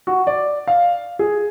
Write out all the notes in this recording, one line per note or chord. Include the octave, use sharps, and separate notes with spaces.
F#4
D5
F5
G#4